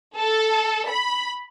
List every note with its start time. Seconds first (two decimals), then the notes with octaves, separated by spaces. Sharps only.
0.18 A4
0.89 B5